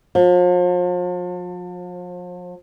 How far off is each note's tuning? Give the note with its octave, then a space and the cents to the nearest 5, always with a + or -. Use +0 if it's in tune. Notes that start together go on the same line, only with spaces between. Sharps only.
F3 +40